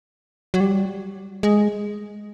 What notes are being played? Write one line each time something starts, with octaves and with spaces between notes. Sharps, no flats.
F#3
G3
G#3